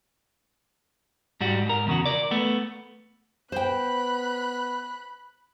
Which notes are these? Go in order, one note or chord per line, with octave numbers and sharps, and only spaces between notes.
G#2 G3 F#4
G#2 A#4
E2 C#3 F#4
A#4 D5
A3 B3
B3 C5 G5 B5 F#6